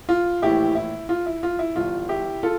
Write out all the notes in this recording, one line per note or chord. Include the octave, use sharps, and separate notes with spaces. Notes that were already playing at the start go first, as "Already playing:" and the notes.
F4
A#1 A2 E3 E4 G4
E4
F4
E4
F4
E4
G1 G2 E3 F4
E4 G4
F4 A4